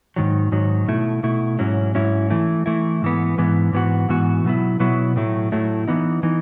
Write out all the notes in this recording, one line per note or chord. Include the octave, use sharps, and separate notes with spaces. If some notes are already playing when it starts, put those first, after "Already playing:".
G#2 D#3 F#3
G#2 D#3 F#3
B2 A3 E4
B2 A3 E4
G#2 F#3 C#4 E4
G#2 F#3 C#4 E4
E3 A3 E4
E3 A3 E4
G#2 E3 B3
G#2 E3 B3
G#2 E3 B3 F#4
G#2 E3 B3 F#4
B2 F#3 B3 E4
B2 F#3 B3 E4
A2 F#3 A3 E4
A2 F#3 A3 E4
E3 B3 D#4
E3 B3 D#4